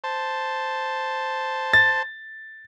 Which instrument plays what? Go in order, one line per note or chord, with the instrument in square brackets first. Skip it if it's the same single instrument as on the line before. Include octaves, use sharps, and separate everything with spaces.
[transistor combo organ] C5 A5
[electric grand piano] A6